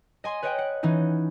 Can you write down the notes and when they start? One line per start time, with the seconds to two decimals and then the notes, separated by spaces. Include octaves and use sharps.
0.24 D#5 G#5 C6
0.43 B4 C#5 D#5 F#5 G5
0.58 F#5
0.83 E3 C#4 D#4